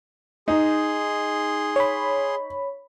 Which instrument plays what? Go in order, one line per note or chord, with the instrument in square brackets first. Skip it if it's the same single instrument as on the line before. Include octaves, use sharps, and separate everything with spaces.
[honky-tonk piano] D#4 [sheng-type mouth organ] G#4 C6
[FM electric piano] C#5 B5